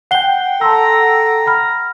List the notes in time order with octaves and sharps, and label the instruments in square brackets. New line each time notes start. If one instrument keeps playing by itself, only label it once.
[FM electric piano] F#5 G5 [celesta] C7 G7
[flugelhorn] A4 [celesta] A5 C6 E6 [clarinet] A#5
[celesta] F#5 B5 F6